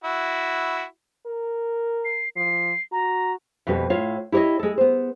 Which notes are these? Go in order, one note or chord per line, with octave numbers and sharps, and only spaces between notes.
E4 F#4
A#4
C7
F3 C7
F#4 A#5
F2 B2 G3 F#4 B4
A2 F4 C#5 F5
E4 G4 B4 C#5 D#5
G#3 A4
B3 C5